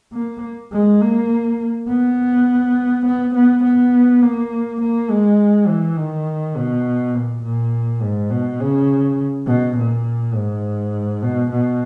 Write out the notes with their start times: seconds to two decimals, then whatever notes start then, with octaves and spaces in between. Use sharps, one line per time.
0.13 A#3
0.73 G#3
1.02 A#3
1.89 B3
3.06 B3
3.35 B3
3.64 B3
4.23 A#3
4.81 A#3
5.10 G#3
5.68 E3
5.97 D#3
6.56 B2
7.15 A#2
7.44 A#2
8.02 G#2
8.30 B2
8.61 C#3
9.47 B2
9.77 A#2
10.35 G#2
11.23 B2
11.51 B2